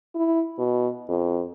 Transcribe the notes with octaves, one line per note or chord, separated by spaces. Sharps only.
E4
B2
F2